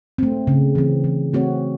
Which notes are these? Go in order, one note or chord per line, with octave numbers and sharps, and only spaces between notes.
A3 C4
C#3
E3 C4
E3
A3 C4 F#4 C#5